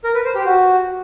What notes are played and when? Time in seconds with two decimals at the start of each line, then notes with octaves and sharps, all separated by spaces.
0.04 A#4
0.14 B4
0.25 C5
0.35 G4
0.45 F#4